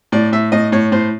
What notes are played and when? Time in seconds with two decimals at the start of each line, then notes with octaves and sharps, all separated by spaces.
0.12 A2 D5
0.32 A2 E5
0.52 A2 D#5
0.72 A2 C#5
0.92 A2 C5